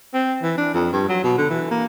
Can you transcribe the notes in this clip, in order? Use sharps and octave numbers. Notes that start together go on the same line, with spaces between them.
C4
E3
D4
F2
G2
F#3
B2
D3
E3
A#3